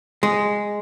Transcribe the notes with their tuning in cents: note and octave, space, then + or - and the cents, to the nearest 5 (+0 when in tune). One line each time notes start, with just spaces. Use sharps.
G#3 -5